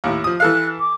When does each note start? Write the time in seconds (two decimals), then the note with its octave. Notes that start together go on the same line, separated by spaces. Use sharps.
0.04 D#2 A2
0.24 F3 D#6
0.40 E3 A4 F5 F#6
0.80 D6